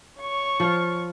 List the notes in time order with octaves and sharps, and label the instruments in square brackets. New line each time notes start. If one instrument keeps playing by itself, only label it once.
[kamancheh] C#5 C#6
[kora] F3 F4 F5